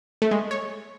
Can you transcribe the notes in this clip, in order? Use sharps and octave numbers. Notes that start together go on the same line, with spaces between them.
A3
G#3
C#5